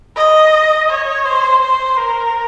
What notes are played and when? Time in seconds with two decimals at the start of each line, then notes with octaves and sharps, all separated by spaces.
0.16 D#5
0.90 C#5
1.26 C5
1.62 C5
1.97 A#4